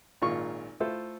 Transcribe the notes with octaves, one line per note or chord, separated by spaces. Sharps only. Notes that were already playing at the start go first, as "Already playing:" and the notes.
G#1 A#2 F4 C#6
A3 E4 F4 A4 C5